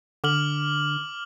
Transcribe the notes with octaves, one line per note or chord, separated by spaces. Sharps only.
D3 D6 F6 F#7